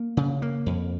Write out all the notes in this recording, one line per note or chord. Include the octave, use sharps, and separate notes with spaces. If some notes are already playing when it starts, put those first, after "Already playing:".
Already playing: A#3
C#3
A#3
F2